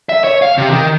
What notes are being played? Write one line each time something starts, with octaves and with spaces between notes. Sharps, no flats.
E5
C#5
F5
C3
D#3